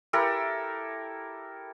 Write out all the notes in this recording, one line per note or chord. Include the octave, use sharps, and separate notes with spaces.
E4 G4 A4 A#4